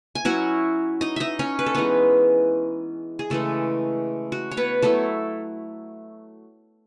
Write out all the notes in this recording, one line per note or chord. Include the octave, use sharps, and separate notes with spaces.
G#5
F#3 C#4 E4 F#4 F#5
D#4 D#5
D#4 D#5 E5
C#4 C#5
B4
A4
E3 G#3 B3 D#4 B4
G#4
C#3 E3 G#3 A3 A4
F#4
C#5
B3 B4
F#3 A3 B3 E4 A4